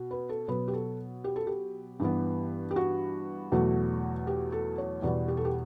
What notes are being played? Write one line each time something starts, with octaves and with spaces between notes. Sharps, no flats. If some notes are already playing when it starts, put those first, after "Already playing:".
Already playing: B2
B4
A4
B2 F#3 B3 B4
G4
A4
G4
A4
G4
G2 E3 B3
G4
F#4
E2 B2 F#3 A3
G4
A4
C#5
E2 B2 G3 B3 D5
G4
A4
G4